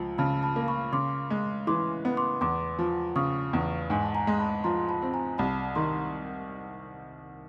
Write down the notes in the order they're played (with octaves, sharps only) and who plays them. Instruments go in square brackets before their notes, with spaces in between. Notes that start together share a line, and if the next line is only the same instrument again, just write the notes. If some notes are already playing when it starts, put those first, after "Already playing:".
Already playing: [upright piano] C#2 F3
[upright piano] C#3 [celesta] A5 B5
[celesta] A5 B5
[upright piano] A#3
[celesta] B5 C#6
[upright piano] C#3 [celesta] C6 D6
[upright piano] G#3
[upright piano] E3 [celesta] C6 D6
[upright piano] B3
[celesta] C6 D6
[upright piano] E2 [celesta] C6 D6
[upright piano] F3
[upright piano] C#3 [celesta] C#6 D#6
[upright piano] E2
[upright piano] G#2 [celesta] G#5
[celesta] A5
G#5 A#5
[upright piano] G#3
[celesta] A5 B5
[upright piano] F3 [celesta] A#5 C6
[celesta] A5 B5
[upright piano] C4
[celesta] G#5 A#5
[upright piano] C2 [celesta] A5 B5
[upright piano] D#3 [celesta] A#5 C6